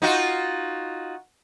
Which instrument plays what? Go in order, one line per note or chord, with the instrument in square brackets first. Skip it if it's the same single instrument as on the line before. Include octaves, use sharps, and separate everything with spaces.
[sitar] D#4 F4 F#4